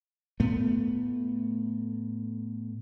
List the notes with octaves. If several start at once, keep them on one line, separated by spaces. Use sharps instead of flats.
A2 A3 B3